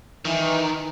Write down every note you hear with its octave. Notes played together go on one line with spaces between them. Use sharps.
D#3 E3